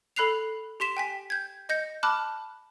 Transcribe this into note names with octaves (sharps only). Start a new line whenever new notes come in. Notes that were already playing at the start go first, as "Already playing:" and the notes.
A4 B5 F#6 C7 F7
G4 C6 B6 E7
G5 G#5 B6
G6 G#6
D#5 G6 A#6 C#7
A5 B5 D6 F6 F#6